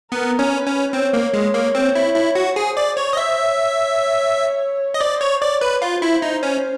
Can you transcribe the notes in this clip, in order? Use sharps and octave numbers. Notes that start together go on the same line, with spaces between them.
B3 A#4
C#4
B4
C#4
C4 C#5
A#3
G#3
A#3
C4
E4
E4
F#4
G#4 C5
D5
C#5
D#5
E5
C#5
D#5
C5 D5
C#5
C#5 D5
B4
F4 C5
E4
D#4
C#4